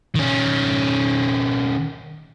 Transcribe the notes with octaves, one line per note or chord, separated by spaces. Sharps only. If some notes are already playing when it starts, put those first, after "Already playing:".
D#3 C#4